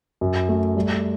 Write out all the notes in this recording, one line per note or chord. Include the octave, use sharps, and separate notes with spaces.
F#2
A3
G3